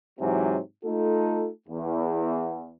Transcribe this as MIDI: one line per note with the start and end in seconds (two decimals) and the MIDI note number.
0.19 0.58 44
0.19 0.58 48
0.19 0.58 52
0.19 0.58 54
0.84 1.49 57
0.84 1.49 63
0.84 1.49 65
0.84 1.49 69
1.68 2.73 40